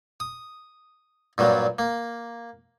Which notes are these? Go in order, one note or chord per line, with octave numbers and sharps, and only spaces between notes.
D#6
G2 A#2 F#3 G3
A#3